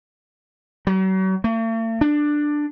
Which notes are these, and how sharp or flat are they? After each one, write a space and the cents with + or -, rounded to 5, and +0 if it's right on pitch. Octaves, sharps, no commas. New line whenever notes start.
F#3 +40
A3 +45
D4 +10